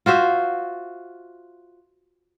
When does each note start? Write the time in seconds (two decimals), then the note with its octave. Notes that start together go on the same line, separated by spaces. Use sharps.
0.06 F4 F#4 C5 E5